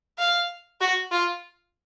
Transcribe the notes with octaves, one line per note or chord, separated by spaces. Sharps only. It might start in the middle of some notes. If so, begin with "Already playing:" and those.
F5
F#4
F4